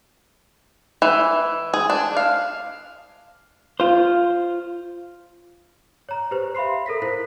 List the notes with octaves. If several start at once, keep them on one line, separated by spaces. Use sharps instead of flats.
E3
G#4
D4
F5
F4 C5
C#5 A#5
G4 B4 C5
E5 F5 B5 C6 C7
A4 A#4 A#6 B6
E4 A#4 C5 B6